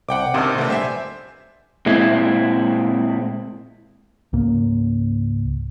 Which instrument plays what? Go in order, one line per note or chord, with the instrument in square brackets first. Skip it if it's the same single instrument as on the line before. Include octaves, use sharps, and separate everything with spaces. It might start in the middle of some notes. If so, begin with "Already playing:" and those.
[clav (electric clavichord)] C2 [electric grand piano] F#5 G5 D6
[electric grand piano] C#2 G#2 [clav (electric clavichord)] C3 D#3 D4
[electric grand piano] A#2 D3 [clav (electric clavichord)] A3 B3
[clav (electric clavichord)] G3 [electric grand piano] C5 E5 G#5
[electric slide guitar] A#2 G#3 C4 E4
[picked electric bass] C#2 G#2 A#3